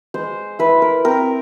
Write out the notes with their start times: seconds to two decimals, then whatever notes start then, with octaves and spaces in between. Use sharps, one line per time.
0.14 G#3 C5
0.59 E4 B4
0.82 A#4
1.04 C4 A#4